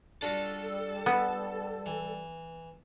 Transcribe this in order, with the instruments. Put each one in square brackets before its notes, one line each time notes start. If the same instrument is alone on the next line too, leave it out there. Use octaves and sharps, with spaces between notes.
[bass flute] G3 [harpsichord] D4 F4 F#4 [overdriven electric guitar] A4
[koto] B3
[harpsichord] E3